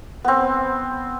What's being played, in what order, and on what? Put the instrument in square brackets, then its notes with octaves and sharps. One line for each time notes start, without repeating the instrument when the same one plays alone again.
[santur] B3 C4